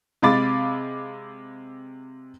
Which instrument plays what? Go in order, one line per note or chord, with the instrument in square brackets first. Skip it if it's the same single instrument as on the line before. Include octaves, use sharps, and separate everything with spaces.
[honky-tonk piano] C3 G#3 F5 B5 D6 A6